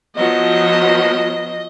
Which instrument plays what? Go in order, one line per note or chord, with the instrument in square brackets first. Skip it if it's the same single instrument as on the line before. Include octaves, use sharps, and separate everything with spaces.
[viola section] F3 F#3 B3 [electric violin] D#5